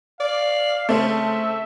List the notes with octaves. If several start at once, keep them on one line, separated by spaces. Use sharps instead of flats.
D5 F5
C#3 A3 C4 E5